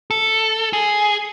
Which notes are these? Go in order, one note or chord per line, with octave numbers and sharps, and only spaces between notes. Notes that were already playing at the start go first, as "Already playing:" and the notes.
A4
G#4